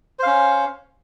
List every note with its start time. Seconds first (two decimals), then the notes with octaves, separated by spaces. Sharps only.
0.19 C5
0.23 F5
0.26 C#4